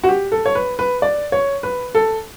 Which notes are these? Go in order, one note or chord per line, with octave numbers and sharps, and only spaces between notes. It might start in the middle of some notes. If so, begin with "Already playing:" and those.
F#4
G4
A4
C#5
B4
B4
D5
C#5
B4
A4